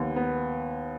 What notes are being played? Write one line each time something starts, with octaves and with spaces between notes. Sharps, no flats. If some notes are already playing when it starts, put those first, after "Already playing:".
Already playing: D#2 B3
B3